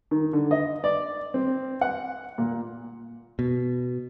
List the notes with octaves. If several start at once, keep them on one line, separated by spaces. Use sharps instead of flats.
D#3
D3
D#5
D5
C4
F#5
A#2
B2